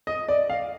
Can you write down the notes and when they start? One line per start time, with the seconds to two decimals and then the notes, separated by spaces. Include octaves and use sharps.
0.07 D#5
0.29 D5
0.50 F5